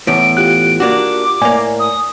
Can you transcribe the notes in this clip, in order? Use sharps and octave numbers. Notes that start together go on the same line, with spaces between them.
E2 A2 D7
F4 G4 F#6 D7
A#3 D4 F#4 D6
A2 A#3 D5 G#5
D#6